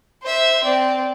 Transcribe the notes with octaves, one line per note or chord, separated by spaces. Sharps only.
C5 E5
C4 D5